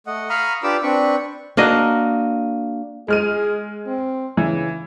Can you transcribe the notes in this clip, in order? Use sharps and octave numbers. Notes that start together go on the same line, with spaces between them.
A3 D#5 F#5
F5 A#5 B5 C#6 D#6 F6
D4 F4 G4 B4 D6 E6
C4 D4 B4 C#6
A#3 D4 F#4 D#5
G#3 G#4 F6 D#7
C4
C#3 E3